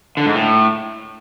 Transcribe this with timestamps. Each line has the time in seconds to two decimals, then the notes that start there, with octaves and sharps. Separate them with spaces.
0.17 D3
0.26 G#2
0.35 A2